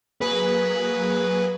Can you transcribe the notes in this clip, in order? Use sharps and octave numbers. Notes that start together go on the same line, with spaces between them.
F#3 A#3 G#4 B4